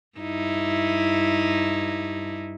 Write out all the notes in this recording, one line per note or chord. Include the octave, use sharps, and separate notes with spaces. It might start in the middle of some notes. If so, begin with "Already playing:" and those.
G2 D#4 E4